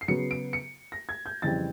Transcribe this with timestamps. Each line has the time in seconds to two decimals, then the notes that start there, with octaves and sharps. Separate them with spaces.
0.01 C7
0.08 C#3 F#3 B3 C#7
0.31 D7
0.53 C#7
0.92 A#6
1.09 G#6
1.26 G6
1.42 F2 C#3 E3 G3 C4 A6